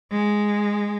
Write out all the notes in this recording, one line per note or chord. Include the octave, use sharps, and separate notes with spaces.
G#3